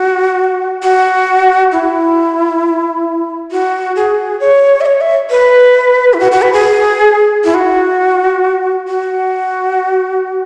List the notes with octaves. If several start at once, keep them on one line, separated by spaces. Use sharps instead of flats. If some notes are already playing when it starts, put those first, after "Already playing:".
Already playing: F#4
F#4
E4
F#4
G#4
C#5
E5
C#5
E5
B4
E4
F#4
F#4
B4
G#4
E4
F#4
F#4